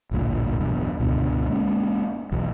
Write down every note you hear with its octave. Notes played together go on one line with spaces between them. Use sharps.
A1 D2 G2 A#2
B1 E2 G2 B2
C#2 G2 B2 D3
G#3 A#3 C#4
B1 E2